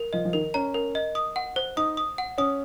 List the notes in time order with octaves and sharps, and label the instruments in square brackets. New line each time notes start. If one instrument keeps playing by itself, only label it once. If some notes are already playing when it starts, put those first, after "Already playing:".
Already playing: [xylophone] A#4
[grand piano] F3 [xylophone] D#5
[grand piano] F3
[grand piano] D#3 [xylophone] A#4
[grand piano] C#4 [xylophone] A#5
[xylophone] A#4
D#5
D#6
F#5
C5
[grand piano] D#4 [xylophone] D#6
[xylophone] D#6
F#5
[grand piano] C#4 [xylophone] D#6